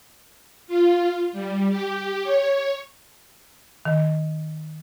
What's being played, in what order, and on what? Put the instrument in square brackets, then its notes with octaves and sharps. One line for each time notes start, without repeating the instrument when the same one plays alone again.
[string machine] F4
G3
G4
C#5
[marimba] D#3